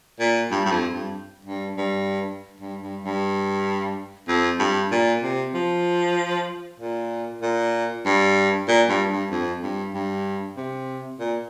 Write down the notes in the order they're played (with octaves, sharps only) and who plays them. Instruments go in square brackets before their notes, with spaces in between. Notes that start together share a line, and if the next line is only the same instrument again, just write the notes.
[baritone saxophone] A#2
G2
G2
F2
G2
G2
G2
G2
G2
G2
F2
G2
A#2
C3
F3
A#2
A#2
G2
A#2
G2
G2
F2
G2
G2
C3
A#2